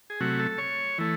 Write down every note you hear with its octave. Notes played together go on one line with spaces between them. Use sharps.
G#4
C3 F#3 A3 F#4
A4
C#5
E3 A3